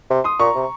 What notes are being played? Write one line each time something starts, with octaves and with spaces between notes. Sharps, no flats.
C3
C6 D#6
A#2 A#5 C#6
C3